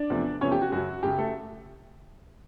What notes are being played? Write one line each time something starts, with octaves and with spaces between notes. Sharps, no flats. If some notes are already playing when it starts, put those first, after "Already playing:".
Already playing: D4 D5
E2 C3 F3 A3
E2 C3 F3 A3 C#4 C#5
G4
F#4
F#2 C#3 F#3 F#4
F#2 C#3 F#3 G4
A3 A4